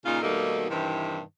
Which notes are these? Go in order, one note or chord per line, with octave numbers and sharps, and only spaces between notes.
A#2 C#3 D#4 F4
B2 D#3 G3 A3 A#3 D#4
G2 C3 D#3 E3